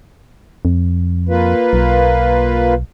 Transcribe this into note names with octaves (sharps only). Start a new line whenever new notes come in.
F2
A#3 F4 B4
B1